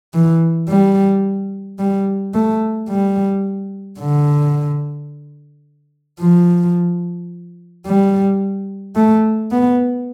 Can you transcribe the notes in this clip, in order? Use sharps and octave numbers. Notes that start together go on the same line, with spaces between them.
E3
G3
G3
A3
G3
D3
F3
G3
A3
B3